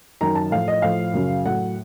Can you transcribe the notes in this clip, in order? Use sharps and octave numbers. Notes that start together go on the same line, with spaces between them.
F#2 D#3 F#3 A#5
A5
A2 F3 F5
D#5
A2 F3 F5
F#2 C#3 F#3
A2 F#3 F#5